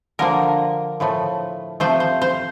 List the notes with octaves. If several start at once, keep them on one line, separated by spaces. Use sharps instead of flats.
D3 F3 A#3 A#4
A2 F3 A3
C3 F3 A3 C5
C5
C5